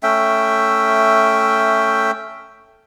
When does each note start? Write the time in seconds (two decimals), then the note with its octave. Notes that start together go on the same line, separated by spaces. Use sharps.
0.03 A3 C#4 E5 G5